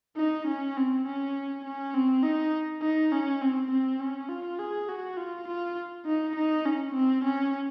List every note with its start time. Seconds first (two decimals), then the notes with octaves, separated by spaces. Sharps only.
0.17 D#4
0.47 C#4
0.77 C4
1.06 C#4
1.64 C#4
1.94 C4
2.23 D#4
2.82 D#4
3.12 C#4
3.41 C4
3.71 C4
4.00 C#4
4.29 F4
4.59 G#4
4.88 F#4
5.17 F4
5.47 F4
6.06 D#4
6.35 D#4
6.65 C#4
6.94 C4
7.23 C#4